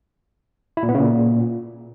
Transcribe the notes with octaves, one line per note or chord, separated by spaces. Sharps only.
E4
A#2
B3
C#3
A#2